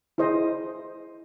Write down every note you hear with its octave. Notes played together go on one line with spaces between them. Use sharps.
E4 G#4 C5 D#5